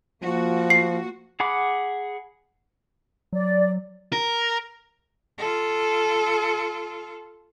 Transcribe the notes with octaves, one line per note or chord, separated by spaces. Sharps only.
F3 A#3 F#4
C7
G#4 F#5 B5 D6
F#3 D5
A#4
F4 A4